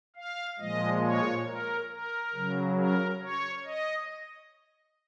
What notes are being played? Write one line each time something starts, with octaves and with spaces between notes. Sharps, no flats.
F5
A#2 F3 G#3 D#5
C#5
A#4
A#4
C#3 F#3
A#4
C#5
D#5